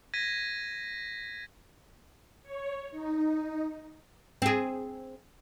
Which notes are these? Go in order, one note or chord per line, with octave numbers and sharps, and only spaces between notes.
G#6 A#6 B6 D#7
C#5
D#4
C4 G#4